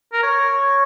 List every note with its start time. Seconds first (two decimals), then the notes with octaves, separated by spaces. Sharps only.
0.13 A#4
0.23 C#5